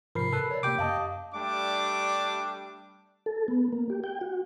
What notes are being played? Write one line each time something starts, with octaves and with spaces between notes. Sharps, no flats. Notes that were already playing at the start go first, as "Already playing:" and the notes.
G#2 C3 F3 A#4 B5 C7
A4 B4
C#5 D5
C3 A#3 G4 G5 D6
F#2 D#5 F5 A5 D#6
G3 A3 D4 D6
A4
B3
A#3
G4
G5
F#4